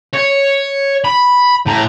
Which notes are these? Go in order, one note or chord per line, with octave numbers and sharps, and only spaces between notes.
C#5
B5
A2 A#5